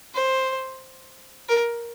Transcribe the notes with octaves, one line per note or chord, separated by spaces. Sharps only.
C5
A#4